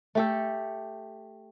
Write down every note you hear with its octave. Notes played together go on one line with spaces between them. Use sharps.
A3 G4 A4